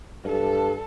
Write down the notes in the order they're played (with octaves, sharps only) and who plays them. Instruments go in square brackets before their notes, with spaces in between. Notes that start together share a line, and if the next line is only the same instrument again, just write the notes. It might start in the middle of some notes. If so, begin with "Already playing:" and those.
[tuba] G2 [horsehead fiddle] A4